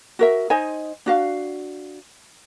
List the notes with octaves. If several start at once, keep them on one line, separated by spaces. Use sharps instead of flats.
F#4 A#4 E5
D#4 C5 D#5 G#5
D4 F#4 F5